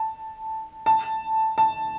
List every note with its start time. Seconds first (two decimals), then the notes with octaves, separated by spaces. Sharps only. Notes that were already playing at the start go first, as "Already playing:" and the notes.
Already playing: A5
0.86 A5
1.58 A5